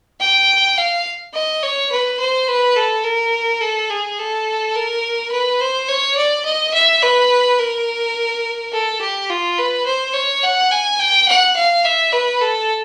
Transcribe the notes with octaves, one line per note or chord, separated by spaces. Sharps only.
G5
F5
D#5
C#5
B4
C5
B4
A4
A#4
A4
G#4
A4
A#4
B4
C5
C#5
D5
D#5
E5
B4
A#4
A4
G4
F4
B4
C5
C#5
F#5
G#5
G5
F#5
F5
E5
B4
A4